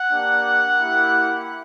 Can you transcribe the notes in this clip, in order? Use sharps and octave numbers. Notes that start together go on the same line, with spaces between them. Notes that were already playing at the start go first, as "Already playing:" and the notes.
Already playing: F#5
A#3 D4 G4
A#3 E4 G4